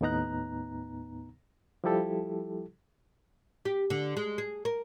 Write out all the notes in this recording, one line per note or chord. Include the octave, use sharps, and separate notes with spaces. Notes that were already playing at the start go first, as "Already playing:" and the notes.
D#2 A2 B3 D#4 A#5 F#6
F3 G3 E4 G4 A4
G4
D3
G#3
G#4
A#4